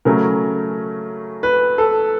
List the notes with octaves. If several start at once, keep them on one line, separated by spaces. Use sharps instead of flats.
C#3 F#3 A3 C#4 A#4
B4
A4